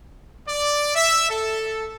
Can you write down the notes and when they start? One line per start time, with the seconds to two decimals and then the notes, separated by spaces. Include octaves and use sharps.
0.48 D5
0.95 E5
1.30 A4